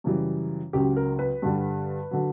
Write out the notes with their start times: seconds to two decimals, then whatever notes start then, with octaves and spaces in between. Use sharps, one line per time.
0.04 F#2 C#3 E3 G3
0.73 C#2 C#3 F#3 G4
0.96 A#4
1.19 B4
1.42 G2 D3 G3
2.11 D3 F#3